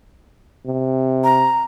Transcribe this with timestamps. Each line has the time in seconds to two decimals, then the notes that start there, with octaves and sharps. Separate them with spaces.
0.67 C3
1.24 A#5